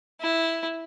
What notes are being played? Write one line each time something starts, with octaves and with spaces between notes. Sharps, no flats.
E4